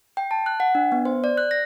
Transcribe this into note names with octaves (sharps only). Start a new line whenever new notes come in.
G5
A5
F#6
F#5
D4
B3
C5
D5
F#6
A#6